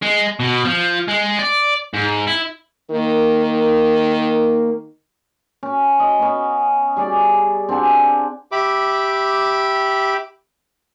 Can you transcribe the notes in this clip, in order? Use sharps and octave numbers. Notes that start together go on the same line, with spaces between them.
G#3
B2
F3
G#3
D5
G#2
E4
D#3 A#3
C#4
D#5
B3 C#4
G3 G#4 D5
C4 D4 F#5 G#5
G4 E5 B5 D6